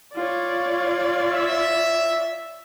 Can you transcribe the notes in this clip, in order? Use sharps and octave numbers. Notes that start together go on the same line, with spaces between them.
F4 C#5 D5
E5